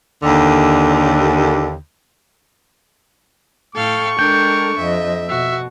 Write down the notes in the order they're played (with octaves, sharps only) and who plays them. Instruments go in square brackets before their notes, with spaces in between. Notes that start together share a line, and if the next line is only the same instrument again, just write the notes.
[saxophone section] D#2 D3
[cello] A2 G5 [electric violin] A4 F5 [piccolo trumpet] C#6
[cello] G#3 A4 [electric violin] D4 A#4 [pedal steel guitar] G5
[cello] F2 D#5 [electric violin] E5
[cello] B2 [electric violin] F#4 [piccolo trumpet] E5